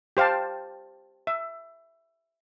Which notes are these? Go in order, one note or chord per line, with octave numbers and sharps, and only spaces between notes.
G4 C5 F5 G5 A5
E5